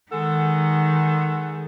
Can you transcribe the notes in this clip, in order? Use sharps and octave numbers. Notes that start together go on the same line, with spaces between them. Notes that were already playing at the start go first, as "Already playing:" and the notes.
D#3 G#3 A4 F#5